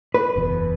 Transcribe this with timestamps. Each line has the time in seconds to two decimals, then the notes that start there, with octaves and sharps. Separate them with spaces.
0.14 B4
0.36 F#1 E2 B2